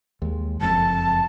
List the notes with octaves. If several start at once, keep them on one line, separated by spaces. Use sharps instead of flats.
D#2 G#3
F#1 F2 A5